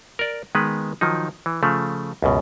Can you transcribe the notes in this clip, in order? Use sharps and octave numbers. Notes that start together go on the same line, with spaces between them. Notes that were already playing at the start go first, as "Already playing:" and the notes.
A#4 D5
D#3 G#3 B3 B4
D#3 F3 F#3 D#4
E3
C#3 F3 A3
C#2 F#2 B2